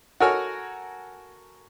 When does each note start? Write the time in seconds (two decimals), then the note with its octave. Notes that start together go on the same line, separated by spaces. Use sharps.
0.20 F#4 A4 A#4 C#5 G#5 F6